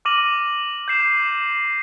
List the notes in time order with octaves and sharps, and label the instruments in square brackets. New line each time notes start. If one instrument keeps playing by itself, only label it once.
[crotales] D6 F6 A#6 D#7 F#7
G6 C7 E7